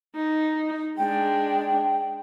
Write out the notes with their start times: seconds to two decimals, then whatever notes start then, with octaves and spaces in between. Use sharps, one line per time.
0.16 D#4
0.98 G#3 D4 G5